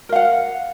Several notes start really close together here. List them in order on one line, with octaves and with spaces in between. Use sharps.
A#4 F5 F#5